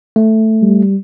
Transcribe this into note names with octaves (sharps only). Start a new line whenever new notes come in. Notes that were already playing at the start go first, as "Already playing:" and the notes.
A3
G3